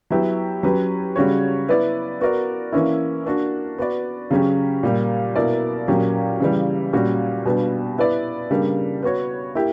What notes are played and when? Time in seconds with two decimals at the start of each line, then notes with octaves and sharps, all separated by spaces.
0.11 F#3 B3 E4 G4
0.63 F#3 C#4 G4 B4
1.16 C#3 G3 C#4 F#4 C#5
1.69 B3 E4 B4 D5
2.21 B3 F#4 A#4 D5
2.73 E3 A#3 C#4 E4
3.25 A#3 D4 F#4
3.78 B3 F#4 B4 D5
4.31 C#3 F#3 C#4 G4
4.83 A#2 G3 A#3
5.36 B2 A#3 E4 A#4 D5
5.87 A#2 F#3 A#3 C#4 G4
6.40 C#3 E3 G3
6.93 A#2 G3 C#4 F#4
7.45 B2 G3 B3 D4 G4
7.98 B3 E4 B4 D5
8.51 C#3 G3 A#3 D4
9.03 B3 F#4 C#5
9.55 A#3 E4 G4